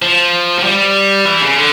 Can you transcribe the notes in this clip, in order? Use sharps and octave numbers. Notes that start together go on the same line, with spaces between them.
F3
F3
G3
E3
C#3
D3